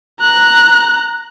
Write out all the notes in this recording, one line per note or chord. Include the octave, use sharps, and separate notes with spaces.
A#5 F#6